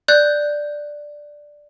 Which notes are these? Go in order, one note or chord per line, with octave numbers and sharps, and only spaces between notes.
D5 F#6 G6